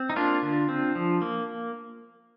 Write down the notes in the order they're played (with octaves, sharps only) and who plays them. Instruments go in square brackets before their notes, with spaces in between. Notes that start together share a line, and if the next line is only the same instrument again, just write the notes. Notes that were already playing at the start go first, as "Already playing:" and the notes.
Already playing: [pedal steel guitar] C4
D#4
A#3 D4 F4
D3
C4
F3
A#3